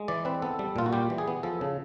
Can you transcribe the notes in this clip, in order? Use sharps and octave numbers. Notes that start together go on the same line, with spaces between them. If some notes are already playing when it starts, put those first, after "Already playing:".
Already playing: G#3
E3 D5
C4 B4
B3 A4
G3
A#2 F4
F#4
G3 G4
E3
G#4
B3
F3 A4
C#3